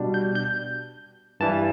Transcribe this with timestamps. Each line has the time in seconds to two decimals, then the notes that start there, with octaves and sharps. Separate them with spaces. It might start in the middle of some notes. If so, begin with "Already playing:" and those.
Already playing: B2 G3 D4
0.14 G6
0.35 G6
1.40 G2 E3 G3 A5